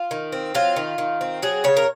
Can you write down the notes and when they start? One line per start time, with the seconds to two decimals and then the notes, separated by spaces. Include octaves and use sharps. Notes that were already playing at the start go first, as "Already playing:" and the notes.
Already playing: F4
0.11 D#3
0.32 C4
0.55 F#3 F4
0.76 D#3
0.98 D#3
1.21 C4
1.42 F#3 G#4
1.64 C#3 C#5
1.77 A#4